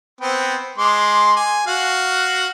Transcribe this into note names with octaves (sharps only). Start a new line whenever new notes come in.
B3 C4 G5
G#3 C6 D6
G#5
F#4 F5